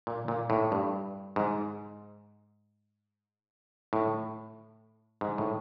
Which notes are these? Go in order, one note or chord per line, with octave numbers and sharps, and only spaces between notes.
A#2
A#2
A2
G2
G#2
A2
G#2
A2